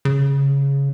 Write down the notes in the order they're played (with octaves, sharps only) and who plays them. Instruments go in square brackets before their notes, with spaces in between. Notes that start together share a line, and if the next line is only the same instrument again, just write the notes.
[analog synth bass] C#3